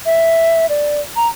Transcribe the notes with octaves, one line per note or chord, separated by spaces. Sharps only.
E5
D5
A#5